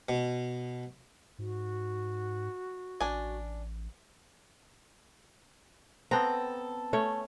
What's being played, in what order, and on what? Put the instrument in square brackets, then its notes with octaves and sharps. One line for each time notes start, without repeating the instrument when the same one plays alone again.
[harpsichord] B2
[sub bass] G#2 [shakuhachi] F#4
[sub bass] A1 [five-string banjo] D4 G#5
[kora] B3 C4 [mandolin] A4 A#5
[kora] A3 C#4 C#5